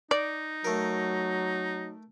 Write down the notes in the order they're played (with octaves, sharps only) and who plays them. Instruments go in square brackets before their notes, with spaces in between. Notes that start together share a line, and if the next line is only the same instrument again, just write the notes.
[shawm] D#4 [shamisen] D5
[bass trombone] F#3 [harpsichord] A3 A#4